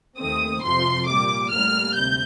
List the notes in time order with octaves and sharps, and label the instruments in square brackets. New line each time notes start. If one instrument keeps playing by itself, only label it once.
[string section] D#2 D#3 A3 C4 D#6
F2 C3 F3 C6
A#2 G3 A#3 D6
A2 G3 A#3 F6
D2 C3 G6